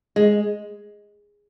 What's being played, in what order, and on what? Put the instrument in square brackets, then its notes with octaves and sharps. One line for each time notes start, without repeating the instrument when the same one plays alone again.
[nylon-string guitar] G#3